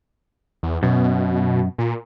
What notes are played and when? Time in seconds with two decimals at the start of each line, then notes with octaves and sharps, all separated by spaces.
0.63 E2
0.83 F#2 B2
1.78 A#2